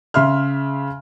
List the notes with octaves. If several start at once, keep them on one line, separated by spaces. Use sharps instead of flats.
C#3 E5 C6 F6